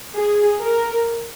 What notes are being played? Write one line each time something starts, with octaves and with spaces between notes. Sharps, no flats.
G#4
A#4